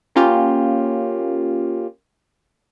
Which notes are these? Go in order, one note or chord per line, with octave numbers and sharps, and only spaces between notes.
A#3 C#4 F4 G4